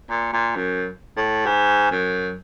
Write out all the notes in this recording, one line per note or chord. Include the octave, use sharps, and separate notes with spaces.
A#2
A#2
F#2
A2
G#2
F#2